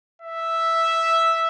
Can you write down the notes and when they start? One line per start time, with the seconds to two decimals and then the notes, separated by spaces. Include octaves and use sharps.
0.22 E5